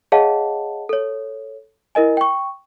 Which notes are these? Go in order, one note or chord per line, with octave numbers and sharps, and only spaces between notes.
G#4 C#5 D#5 F5 F#5 A5
A4 C#5
E4 A#4 D#5 G#5
G5 C#6